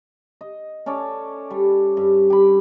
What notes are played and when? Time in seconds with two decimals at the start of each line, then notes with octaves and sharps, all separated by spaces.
0.41 D#5
0.86 C#4 A4 C#5 D5
1.51 G3
1.97 G2
2.30 G4 B5